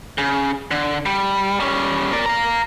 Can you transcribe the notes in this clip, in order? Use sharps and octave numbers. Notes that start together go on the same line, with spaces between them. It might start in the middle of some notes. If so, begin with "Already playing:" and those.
C#3
D3
G3
G3 C#4
A#4 D5
F5 A#5